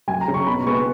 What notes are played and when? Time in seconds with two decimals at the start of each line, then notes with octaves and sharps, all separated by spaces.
0.08 F#2 G#5
0.21 A#5
0.27 C#3 G#3 C#4
0.34 C#6
0.47 B2 B5
0.66 G#3 B3 C#6